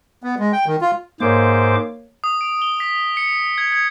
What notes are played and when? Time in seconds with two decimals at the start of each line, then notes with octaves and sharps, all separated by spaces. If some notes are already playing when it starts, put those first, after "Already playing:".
0.23 B3
0.39 G#3
0.53 G5
0.67 D#3
0.81 F4
1.20 G#2 A#3 A#4 C5 C#5 D6
2.24 D#6
2.41 D7
2.62 G7
2.80 B6
3.17 C#7
3.58 G#6
3.72 G#6